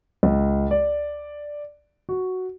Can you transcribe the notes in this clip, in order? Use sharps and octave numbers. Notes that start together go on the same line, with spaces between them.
C#2
D5
F#4